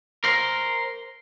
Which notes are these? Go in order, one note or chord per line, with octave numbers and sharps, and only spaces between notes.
A#4 C5